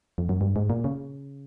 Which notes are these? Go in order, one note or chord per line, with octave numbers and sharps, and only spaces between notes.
F2
F#2
G2
G#2
A#2
C#3